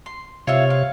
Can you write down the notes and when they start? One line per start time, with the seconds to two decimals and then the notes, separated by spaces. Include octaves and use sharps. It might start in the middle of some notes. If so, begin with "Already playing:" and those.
0.06 C6
0.47 C3 F4 C#5 E5 F5
0.70 F5